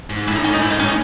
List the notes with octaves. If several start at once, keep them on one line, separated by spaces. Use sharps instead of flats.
G#2
A2 E4
D#4
G#2 C#4
A2 D#4
G#2 E4
D#4
A2 C#4
D#4